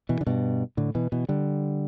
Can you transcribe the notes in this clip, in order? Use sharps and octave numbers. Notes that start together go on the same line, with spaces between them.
B2 E3
D3
G2 B2
A2 D3
B2 E3
B2 E3
D3 G3